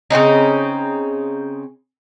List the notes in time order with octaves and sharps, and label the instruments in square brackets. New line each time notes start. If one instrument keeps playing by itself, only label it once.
[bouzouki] C#3 C4 C#4 D#4